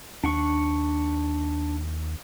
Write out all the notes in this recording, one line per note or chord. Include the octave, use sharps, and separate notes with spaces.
D#2 D4 F#5 C#6